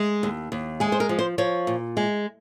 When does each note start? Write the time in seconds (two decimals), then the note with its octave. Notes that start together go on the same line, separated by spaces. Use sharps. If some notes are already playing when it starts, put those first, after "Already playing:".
Already playing: G#3
0.23 D#2
0.52 D#2
0.80 G#3 G#4
0.92 C5
1.00 A#4
1.09 F3
1.19 C5
1.38 F3 C#5
1.67 A#2
1.97 G#3